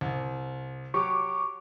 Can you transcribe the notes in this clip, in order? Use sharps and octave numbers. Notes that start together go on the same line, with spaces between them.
C2
F#3 G4 C#6 D6